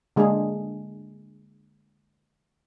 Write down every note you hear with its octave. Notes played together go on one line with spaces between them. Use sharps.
D3 G#3 A#3 D4 G#4